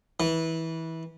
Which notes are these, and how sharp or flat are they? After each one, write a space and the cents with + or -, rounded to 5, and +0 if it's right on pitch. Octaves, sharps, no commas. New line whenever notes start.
E3 -20